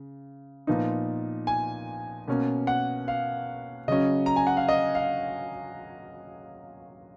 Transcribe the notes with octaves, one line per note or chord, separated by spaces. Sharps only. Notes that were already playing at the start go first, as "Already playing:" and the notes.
Already playing: C#3
A#2 F3 B3 D#4
G#5
B2 A#3 C#4
F#5
F5
C#3 F#3 C#4 D#5
A#5
G#5
F#5
F5
D#5
F5